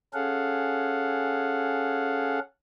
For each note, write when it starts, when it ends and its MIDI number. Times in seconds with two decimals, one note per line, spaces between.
0.14 2.39 61
0.14 2.39 68
0.14 2.39 69
0.14 2.39 77
0.14 2.39 78